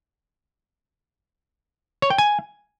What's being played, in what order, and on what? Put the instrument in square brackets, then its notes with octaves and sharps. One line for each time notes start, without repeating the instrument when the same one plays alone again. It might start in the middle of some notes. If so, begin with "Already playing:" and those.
[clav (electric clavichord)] C#5
G5
G#5